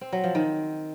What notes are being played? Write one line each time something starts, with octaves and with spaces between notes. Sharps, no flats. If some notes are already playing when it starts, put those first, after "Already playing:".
C4
F#3
F3
D#3